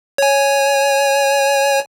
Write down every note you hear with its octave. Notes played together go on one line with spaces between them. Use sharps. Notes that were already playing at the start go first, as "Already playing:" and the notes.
C#5 G#5